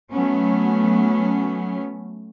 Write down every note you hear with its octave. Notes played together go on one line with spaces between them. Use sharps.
F#3 A3 B3 C#4